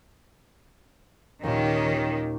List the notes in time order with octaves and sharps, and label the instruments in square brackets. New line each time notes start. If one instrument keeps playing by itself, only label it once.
[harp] D#2 A#2 [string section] D#3 [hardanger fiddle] C#4 G4